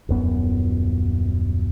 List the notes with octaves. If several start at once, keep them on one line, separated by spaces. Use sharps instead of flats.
D#1 F#2 B3